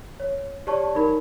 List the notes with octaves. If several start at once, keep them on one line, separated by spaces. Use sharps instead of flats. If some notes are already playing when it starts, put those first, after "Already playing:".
C#5
G4 C#5 D5 A5 C#6
D#4 A#4 B5